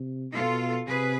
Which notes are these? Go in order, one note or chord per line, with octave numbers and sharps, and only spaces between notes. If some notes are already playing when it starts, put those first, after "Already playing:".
Already playing: C3
B2 F4 A4
C3 G#4 B4